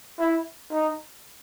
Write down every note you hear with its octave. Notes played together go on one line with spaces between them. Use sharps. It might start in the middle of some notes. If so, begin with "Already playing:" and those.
E4
D#4